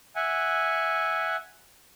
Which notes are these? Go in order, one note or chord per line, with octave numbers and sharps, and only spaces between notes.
E5 F#5 G#5